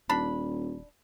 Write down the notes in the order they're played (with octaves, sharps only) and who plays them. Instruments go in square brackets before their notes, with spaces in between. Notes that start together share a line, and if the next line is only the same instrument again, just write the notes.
[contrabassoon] D#1 [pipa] D4 B5